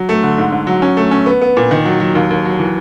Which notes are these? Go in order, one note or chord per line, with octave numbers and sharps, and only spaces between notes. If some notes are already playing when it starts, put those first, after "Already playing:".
Already playing: F#3
A3
D3
G#2
G#2
F#3
C#4
A3
C#4
B3
B3
A#2
D#3
F#3
F#3
D#2
D#2
F#3
E3